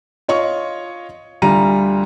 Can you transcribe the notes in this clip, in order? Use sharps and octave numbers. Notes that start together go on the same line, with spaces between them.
F4 C#5 D#5 C#6
D2 G3 F4 A#5 D#7